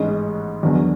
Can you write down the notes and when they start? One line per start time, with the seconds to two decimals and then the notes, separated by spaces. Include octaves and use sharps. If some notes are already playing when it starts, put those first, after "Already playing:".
Already playing: A1 G#2 G#3 C#4 G#4
0.62 E1 E2 D3 F#3 C#4